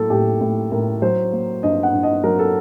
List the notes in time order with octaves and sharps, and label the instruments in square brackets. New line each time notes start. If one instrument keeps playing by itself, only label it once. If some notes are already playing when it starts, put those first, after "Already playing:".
Already playing: [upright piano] A2 F#3 A#3 A4
A2 G4
A2
A2 A#4
F#3 C5
A#3
G2 D#5
F#5
G2
D#5
F#3 A#4
A4